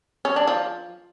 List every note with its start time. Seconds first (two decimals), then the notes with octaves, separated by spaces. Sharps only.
0.25 C#4
0.36 D4
0.47 F3